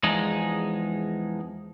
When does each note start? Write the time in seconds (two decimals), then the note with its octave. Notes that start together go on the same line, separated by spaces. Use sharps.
0.03 E2 F3 G#3 D#4